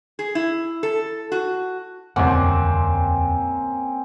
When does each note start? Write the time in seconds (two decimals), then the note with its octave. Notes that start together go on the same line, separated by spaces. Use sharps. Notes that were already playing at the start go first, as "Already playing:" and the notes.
0.19 G#4
0.35 E4
0.83 A4
1.32 F#4
2.16 D#1 C2 F2 D3 A#3 C4 C#4 F#5